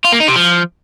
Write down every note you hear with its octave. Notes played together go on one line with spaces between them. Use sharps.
F4
A#3
D#4
C3
F3